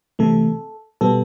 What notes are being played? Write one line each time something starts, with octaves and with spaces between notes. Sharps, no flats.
C3 E3 A3 A4
B2 G3 B3 A4